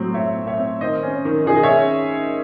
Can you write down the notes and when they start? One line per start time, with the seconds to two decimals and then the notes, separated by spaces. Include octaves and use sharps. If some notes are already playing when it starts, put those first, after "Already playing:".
Already playing: A2 F#3 C4
0.14 A2 C#5 E5
0.36 C4
0.47 C#5 E5
0.58 C4
0.81 D#3 C5 D#5
1.03 C#4
1.25 D#3
1.46 D#3 G#4
1.55 D#5
1.63 C#5 E5
1.69 C#4